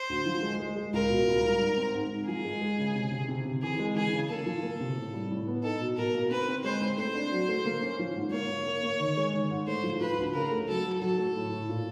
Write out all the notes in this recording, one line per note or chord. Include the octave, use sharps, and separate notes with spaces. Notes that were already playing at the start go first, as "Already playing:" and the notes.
Already playing: C5
D2
F3
G#3
G#3
G#3
C#2 A#4
B2
C#2
G3
G#2
C4
G#2
G#2
F3 G#4
G#3
G#3
C#3
C3
C3
C3
C3
E3 G#4
G#3
E3 G#4
C#3
A#3 A4
F3
A#3
C3
A2
G3
A2
B3
D#4 A4
B2
B2 A#4
A#3
C4 B4
C4
G#3 C5
C4
A3 C5
D4
F#3
A3
A#3
C#4
F3
G#2
A#3 C#5
A#3
A#3
A#3
D#3
G#3
D#3
G#2
A3 C5
F3
F3 B4
D2
C#3 A#4
A3
F#3 A4
F#3
F#3 A4
A3
A2
A2
A#2